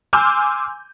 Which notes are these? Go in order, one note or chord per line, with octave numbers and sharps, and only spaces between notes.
G#5 C6 D6 E6 F6 G6